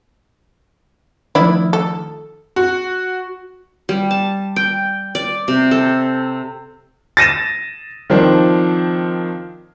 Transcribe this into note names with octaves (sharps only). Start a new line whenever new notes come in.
D#3 F3 A3 D4 E4
A4
F#4
G3
A5
G5
D5
C3
A4
A6 A#6 D#7 E7
D#3 F3 C4 D4